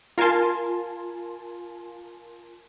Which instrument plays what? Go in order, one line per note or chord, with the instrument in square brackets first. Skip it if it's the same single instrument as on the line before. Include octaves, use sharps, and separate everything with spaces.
[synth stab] F4 A#4 F5 G#5 A5 C6